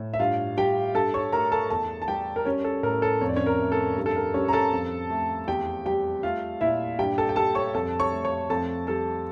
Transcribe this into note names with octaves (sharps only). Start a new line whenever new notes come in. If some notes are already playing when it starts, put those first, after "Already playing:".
Already playing: A2
E5
G2 F4 F5
G3 G4 G5
G2 A4 A5
C#5 C#6
A3 A#4 A#5
A4 A5
E2 A4 A5
A5
G3 G4 G5
A#4
G3 C#4 C#5
A4
A2 A#4
A4
F2 C#5
D5
C#4 C#5
A#4
A3
A4
G2
A4
A#4
G3 C#4 C#5
A#5
A4 A5
F2
A3
E2 G4 G5
G3 G4 G5
A3 F4 F5
A#2 E4 E5
G2 G4 G5
A4 A5
G5
G3 A4 A5
C#5 C#6
F2 A4 A5
C#5 C#6
A3
C#5 C#6
F2 A4 A5
G3 A4 A5